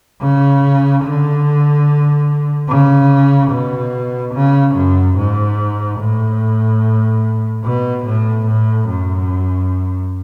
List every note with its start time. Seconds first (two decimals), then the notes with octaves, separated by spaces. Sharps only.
0.21 C#3
1.04 D3
2.69 C#3
3.51 B2
4.34 C#3
4.75 F#2
5.17 G#2
5.99 A2
7.64 B2
8.06 A2
8.46 A2
8.88 F#2